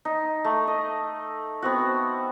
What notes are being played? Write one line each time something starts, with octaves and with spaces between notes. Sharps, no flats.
D#4
A3
D#5
B3 C4 F#4